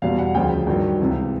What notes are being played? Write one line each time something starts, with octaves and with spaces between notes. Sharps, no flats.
E2 B2 G3 F5
F#5
D2 C#3 F3 G5
G2 D#3 F#3
C#2 C3 E3